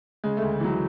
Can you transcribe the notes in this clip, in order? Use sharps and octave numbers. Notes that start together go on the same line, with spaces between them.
C#3 G#3
A3
D2
E3 F#3